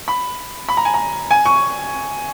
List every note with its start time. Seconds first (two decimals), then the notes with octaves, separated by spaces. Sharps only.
0.08 B5
0.68 B5
0.77 A#5
0.85 G#5
0.94 A#5
1.31 G#5
1.46 C#6